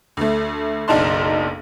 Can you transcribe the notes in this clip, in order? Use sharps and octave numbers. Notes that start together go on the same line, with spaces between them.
D2 A3
F#1 B1 D4 D#4 A5 C6